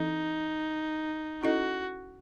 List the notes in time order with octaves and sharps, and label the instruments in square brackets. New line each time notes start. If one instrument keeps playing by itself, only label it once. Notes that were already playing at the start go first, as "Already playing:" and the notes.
Already playing: [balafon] E3 C4 E4 A4 D#5 [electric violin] D#4
[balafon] C#4 E4 A4 D#5 [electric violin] F#4